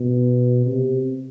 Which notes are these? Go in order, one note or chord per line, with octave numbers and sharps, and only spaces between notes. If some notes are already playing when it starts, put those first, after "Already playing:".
Already playing: B2
C3